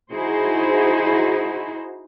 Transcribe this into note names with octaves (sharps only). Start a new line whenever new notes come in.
D#4 E4 F#4 G#4 C5